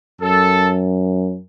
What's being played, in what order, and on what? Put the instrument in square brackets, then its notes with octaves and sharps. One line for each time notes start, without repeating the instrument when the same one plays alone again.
[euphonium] F#2 [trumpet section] A4